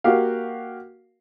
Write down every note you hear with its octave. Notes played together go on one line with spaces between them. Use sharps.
A#3 F#4 G4 F5